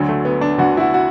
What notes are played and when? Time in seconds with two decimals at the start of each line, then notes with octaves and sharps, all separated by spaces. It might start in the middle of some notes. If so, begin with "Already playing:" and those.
Already playing: D2 D3 F#3
0.09 A3
0.25 B3
0.41 D4
0.58 D2 D3 F#4
0.77 E4
0.80 F#4
0.94 F#4